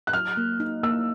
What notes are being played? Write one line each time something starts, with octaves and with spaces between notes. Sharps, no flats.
F#6
F#3 F6
A#3
D#4
A#3 E6